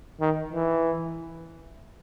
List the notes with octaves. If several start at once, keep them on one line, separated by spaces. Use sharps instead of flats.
D#3
E3